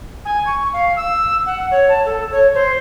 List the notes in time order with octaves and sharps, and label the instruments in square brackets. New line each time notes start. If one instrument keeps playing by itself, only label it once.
[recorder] G#5
C#6
F5
E6
F#5
C#5
A5
A4
C#5
C5